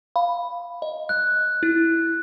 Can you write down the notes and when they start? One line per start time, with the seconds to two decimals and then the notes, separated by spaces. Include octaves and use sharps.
0.16 F5 B5
0.82 D#5
1.09 F#6
1.63 E4